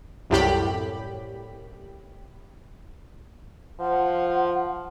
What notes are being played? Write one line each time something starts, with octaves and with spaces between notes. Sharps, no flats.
C2 F#2 A2 G4 B5
F3 F#5